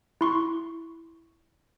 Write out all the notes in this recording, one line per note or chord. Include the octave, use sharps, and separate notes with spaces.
E4 C6 C#6